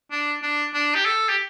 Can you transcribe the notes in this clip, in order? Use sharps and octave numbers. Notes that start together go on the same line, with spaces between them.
D4
D4
D4
G4
A4
G4